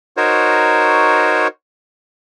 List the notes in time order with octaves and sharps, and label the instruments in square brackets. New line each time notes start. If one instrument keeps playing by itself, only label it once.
[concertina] D#4 F#4 A#4 C5 C#5